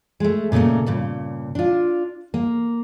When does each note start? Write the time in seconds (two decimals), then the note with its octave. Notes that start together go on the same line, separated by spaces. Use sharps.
0.20 G#3 A3
0.52 A#2 C#3 F3 A3 A#3
0.86 G2 A#2 C#3
1.55 D4 F4
2.34 A#3